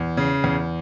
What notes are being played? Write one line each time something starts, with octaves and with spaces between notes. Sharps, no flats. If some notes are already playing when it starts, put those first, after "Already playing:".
Already playing: E2
C#3
E2